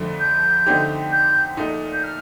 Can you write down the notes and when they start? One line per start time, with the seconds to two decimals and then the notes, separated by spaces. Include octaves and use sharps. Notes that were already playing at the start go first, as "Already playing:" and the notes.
Already playing: F2 D3 F3 A3
0.19 G6
0.66 D3 A3 C4 D#4 G4
1.12 G6
1.57 A#2 A3 D#4
1.93 G6
2.03 F6